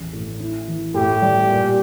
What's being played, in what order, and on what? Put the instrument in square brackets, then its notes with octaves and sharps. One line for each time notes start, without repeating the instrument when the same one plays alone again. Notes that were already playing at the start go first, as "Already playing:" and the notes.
Already playing: [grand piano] A1 E2
A2
E4
E3
[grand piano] A2 [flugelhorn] G4
[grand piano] G3
A#2